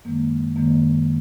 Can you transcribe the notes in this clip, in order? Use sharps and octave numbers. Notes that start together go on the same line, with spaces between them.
F#2 D#3 G#3 A#3
F#2 D#3 G#3 A#3